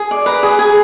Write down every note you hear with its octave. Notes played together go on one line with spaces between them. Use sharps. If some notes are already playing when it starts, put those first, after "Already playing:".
Already playing: G#4
D5
B4 A#5
G#4
G#4